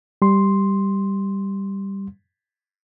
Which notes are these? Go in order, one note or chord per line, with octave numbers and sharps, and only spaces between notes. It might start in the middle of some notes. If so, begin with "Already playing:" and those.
G3 C6